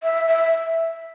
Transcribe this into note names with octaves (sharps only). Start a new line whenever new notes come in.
E5
E5